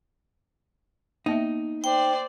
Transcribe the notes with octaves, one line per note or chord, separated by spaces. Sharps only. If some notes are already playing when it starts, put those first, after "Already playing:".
A#3 B3 D#4 E5
C5 D5 G5